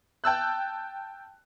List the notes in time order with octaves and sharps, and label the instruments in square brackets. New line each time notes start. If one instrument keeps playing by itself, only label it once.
[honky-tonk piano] G5 A5 E6 F#6